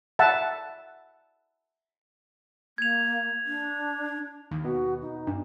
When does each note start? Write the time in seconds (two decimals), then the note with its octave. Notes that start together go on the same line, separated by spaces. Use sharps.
0.19 E5 F#5 A5
2.78 A#3 G#6 F7
3.46 D4
4.51 D#2
4.64 B2 B3 F#4
5.01 D#4
5.27 G2 D4